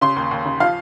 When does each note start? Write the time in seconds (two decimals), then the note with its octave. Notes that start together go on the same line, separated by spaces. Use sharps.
0.01 C#3 C6
0.16 D#2
0.31 D#2
0.45 C#3
0.60 F3 F5